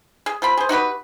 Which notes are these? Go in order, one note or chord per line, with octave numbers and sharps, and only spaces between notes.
G#4
F3 C4 B5
G#4 C5
D#4 F#4 G4 B4